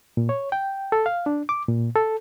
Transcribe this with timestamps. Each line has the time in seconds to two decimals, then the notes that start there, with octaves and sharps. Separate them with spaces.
0.17 A#2
0.29 C#5
0.52 G5
0.92 A4
1.06 F5
1.26 D4
1.49 D6
1.68 A#2
1.95 A4